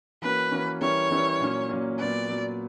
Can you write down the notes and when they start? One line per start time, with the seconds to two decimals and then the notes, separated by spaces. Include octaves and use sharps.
0.22 E3 A#3 C#4 F#4 A#4 B4
0.51 E3 A#3 C#4 F#4 A#4
0.81 E3 G3 C#4 E4 A#4 C#5
1.11 E3 G3 C#4 E4 A#4
1.40 A#2 F#3 A#3 C#4
1.69 A#2 F#3 A#3 C#4
1.99 A#2 F#3 B3 D5
2.28 A#2 F#3 B3